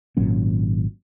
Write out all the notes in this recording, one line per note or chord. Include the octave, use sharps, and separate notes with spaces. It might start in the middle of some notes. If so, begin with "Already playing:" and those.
G#1 A#2 F#3 C#4